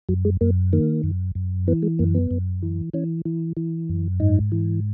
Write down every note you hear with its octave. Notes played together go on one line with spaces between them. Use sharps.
F#2 F#3
G#3
F#2 A#3
D#3 A#3
F#2
F#2
E3 B3
G#3
F#2 A#3
B3
F#2
E3
E3 C#4
E3
E3
F#2
G#2 D#4
E3